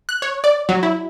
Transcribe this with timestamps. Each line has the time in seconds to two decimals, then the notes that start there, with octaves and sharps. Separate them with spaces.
0.09 F#6
0.22 C#5
0.44 D5
0.69 F#3
0.83 E4